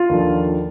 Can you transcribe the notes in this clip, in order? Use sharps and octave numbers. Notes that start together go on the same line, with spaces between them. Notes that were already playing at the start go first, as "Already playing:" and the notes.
Already playing: F4
D#2 D3 F3